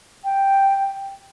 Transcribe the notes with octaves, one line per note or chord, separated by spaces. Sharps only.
G5